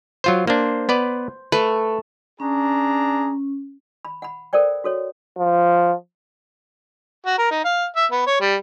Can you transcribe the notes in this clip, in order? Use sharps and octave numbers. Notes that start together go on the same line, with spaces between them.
F#3 F4 C5
A#3 D4 C5
B3 B4 D5
A3 B4
C#4 D4 G#4 A#5
B5
F#5 B5
A4 A#4 C5 D5 G5
F#4 A4 C#5
F3
F#4
A#4
D#4
F5
E5
B3
C#5
G3